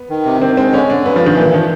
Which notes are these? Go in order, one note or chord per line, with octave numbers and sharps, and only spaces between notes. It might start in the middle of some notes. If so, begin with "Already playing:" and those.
Already playing: B3
D#3
C3
D#3 C4
G#3 C4
D3 C#4
D3 D4
G2 B3
F3
G2
D#3
A#2 E3
D#3 F3